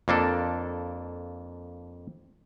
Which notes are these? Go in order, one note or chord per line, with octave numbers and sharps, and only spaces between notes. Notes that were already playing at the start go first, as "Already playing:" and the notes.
F2 A#3 D4 A4